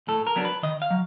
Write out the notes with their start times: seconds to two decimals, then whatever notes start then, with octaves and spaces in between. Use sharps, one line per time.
0.08 A2 A4
0.27 A#4
0.36 F#3 B3 D4
0.45 B4
0.63 D#3 D#5
0.82 F5
0.91 F#3